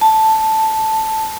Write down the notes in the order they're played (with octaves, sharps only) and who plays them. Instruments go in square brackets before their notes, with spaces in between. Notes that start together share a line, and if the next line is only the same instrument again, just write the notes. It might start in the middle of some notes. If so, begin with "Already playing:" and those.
[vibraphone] A5